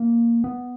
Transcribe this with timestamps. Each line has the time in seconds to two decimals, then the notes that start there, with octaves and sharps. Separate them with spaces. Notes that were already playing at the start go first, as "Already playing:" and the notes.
Already playing: A#3
0.44 B3